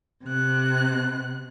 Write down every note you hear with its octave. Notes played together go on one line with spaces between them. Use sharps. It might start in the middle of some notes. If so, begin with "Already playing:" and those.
C3 F#6